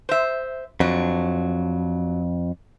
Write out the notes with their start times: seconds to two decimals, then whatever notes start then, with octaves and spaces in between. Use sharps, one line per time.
0.09 C5 E5
0.80 F2 F#3 D4